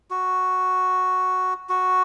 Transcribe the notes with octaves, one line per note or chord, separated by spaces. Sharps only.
F#4
F#4